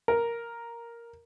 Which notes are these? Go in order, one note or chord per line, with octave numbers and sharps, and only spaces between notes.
A#4